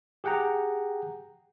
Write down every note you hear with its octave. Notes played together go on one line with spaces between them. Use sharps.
G4 G#4 F#5 G5 A#5